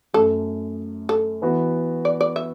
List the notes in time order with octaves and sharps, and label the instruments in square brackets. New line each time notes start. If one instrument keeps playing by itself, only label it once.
[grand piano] F#2 F#3 A3 [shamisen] A4
[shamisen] A4
[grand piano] E3 B3 F#4
[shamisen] D5
D5
E5